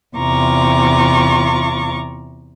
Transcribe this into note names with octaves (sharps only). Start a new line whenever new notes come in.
E2 C3 F4 A#5 C#6 D6